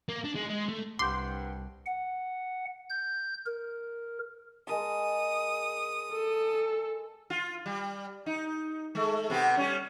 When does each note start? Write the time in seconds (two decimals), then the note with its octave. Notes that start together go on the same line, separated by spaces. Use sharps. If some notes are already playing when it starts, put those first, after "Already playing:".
0.09 A#3
0.24 D4
0.36 G#3
0.49 G#3
0.69 A3
0.99 C2 G2 F#5 G5 C6 D6 G6
1.86 F#5
2.90 G6
3.46 A#4
4.67 G#3 A#4 A5 D#6
6.12 A4
7.30 F4
7.66 G3
8.26 D#4
8.95 G#3 A3
9.30 C3 B3 G4
9.57 G3 C#4